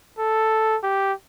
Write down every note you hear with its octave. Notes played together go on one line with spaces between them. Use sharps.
A4
G4